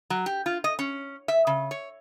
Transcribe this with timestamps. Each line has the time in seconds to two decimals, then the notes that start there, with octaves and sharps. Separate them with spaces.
0.10 F#3
0.26 G4
0.46 F4
0.64 D#5
0.79 C#4
1.28 E5
1.47 C#3
1.71 C#5